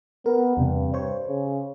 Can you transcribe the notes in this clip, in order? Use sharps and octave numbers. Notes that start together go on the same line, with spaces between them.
B3 A#4
E2 G2 C3
G2 C5 C#5
C#3